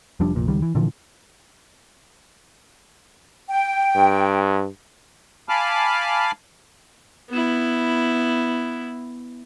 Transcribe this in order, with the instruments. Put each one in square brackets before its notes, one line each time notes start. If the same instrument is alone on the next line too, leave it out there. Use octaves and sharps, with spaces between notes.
[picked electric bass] F1 F3 G3 D4
F1 A#1 A#2
C#2 D#3 G3
E3
A#2 D3 E3 F3
[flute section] G5
[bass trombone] G2
[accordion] F5 G#5 A5 B5 D6 F6
[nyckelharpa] B3 E4